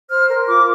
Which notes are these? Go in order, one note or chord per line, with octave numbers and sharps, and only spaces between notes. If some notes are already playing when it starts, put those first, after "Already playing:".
C5 F6
A#4
F4 D6